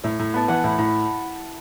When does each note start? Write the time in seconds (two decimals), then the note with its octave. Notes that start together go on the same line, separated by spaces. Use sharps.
0.04 A2 E5
0.19 A2
0.34 B3 A5
0.48 E3 F#5
0.64 A2 E4
0.78 A2 E4